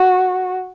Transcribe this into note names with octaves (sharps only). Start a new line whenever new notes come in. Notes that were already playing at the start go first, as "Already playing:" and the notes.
Already playing: F#4